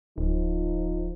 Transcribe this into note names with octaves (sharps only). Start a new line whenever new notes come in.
D1 F3 D#4